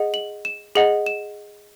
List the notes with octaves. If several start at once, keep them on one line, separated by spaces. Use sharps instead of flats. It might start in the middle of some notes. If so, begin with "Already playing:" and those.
Already playing: G#4 D#5 F#5
F#7
E7
G#4 D#5 F#5 F#7
E7